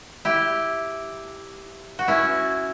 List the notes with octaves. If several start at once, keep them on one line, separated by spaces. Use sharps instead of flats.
E4 G4
F#4
C#4 E4